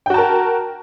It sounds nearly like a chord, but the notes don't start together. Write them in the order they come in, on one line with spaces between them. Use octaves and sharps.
G5 F#4 A5 A#4